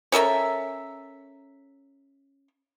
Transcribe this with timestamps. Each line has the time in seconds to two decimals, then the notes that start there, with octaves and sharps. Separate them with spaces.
0.12 C#4 A4 A#4 E5